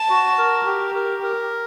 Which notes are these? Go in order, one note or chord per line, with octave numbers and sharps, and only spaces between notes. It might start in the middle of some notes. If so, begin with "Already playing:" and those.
Already playing: A5
F#4
A#4
G4
A#4
A#4